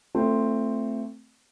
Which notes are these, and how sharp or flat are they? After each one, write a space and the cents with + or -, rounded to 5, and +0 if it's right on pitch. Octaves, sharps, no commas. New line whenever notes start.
A3 +15 C4 +0 F4 -35